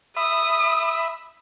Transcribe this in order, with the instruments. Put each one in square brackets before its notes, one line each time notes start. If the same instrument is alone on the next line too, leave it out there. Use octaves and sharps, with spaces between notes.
[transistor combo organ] E5 B5 [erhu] D#6